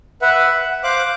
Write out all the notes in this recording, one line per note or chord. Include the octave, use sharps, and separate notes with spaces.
B4 E5 F#5
F#5
C5 F5 D6 F#6